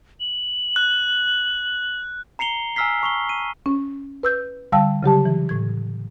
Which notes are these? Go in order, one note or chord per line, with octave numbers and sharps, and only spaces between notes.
F#7
F#6
A#5 C7 C#7 F7 G7
G#5 A#5 E6 F6 B6 C7
A5 C#6 F7 G7
D#7
C#4
B4 E6 G6
D3 G3 F5 G5 A5 E6
C#3 F#3 G4 A5
E3
A2 G#6